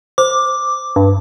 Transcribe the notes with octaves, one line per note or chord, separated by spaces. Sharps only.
C5 D6
G2